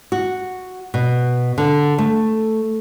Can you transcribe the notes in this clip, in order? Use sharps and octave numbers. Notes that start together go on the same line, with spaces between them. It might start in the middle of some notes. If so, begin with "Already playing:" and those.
F#4
B2
D3
A3